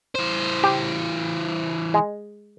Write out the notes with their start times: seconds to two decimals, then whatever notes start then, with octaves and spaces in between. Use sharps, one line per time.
0.15 E3 C5
0.64 G4
1.94 G#3